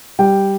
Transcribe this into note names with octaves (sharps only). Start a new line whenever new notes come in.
G3 G5